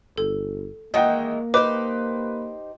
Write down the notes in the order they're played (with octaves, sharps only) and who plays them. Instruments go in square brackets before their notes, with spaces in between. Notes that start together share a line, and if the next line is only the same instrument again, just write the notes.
[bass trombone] G1 [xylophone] A4
[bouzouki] D#3 E3 G#3 [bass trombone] A#3 [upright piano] D#5 F#5 G5
[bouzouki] D#4 G4 C5 [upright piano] B4 [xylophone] D6